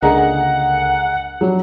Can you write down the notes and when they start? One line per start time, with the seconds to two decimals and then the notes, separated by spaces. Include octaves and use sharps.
0.02 C#2 D3 A#3 G#4 D#5 F#5 A#5
1.41 F2 F#3 G3 D4